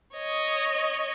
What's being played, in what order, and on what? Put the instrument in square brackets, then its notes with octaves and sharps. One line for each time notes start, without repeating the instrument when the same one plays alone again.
[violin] C#5 D#5